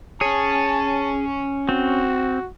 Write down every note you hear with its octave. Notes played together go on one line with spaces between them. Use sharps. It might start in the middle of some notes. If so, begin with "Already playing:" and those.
C#4 G#4 C#5 A5
C4 F#4